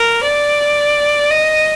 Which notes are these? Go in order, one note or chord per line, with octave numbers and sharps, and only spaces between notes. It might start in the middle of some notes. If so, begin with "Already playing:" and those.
Already playing: A#4
D5
D#5